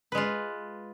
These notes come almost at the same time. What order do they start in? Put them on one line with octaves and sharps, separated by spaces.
B4 G#3 F4